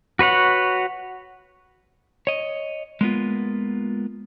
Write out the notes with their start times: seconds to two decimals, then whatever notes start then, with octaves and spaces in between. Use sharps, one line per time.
0.19 F#4 B4 C#5 F#5
2.27 C#5 D#5
3.01 G#3 A#3 B3 F4